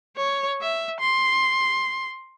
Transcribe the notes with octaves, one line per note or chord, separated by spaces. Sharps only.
C#5
E5
C6